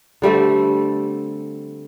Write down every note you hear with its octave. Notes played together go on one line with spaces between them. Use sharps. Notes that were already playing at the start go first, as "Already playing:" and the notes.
D3 G3 A3 C4